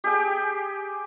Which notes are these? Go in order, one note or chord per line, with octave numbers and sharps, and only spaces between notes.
G4 G#4 G5